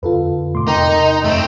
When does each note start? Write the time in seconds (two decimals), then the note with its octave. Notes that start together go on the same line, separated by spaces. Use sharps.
0.03 F2 D3 F4 A4 B4
0.55 G#2 B2 A3 C6 D6
0.68 E2 C3 D#4 A#4 G5 C6
1.25 F#2 A3 C4